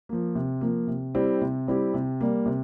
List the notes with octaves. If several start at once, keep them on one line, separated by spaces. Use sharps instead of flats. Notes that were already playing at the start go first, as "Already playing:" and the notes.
F3 A#3
C3
F3 A#3
C3
G3 C4 E4 G4
C3
G3 C4 E4 G4
C3
G3 A#3
C3